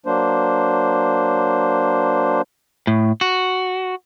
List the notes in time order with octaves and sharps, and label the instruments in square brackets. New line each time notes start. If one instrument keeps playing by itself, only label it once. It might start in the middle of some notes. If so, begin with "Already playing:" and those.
[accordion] F#3 A#3 D4 C5
[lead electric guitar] A2
F#4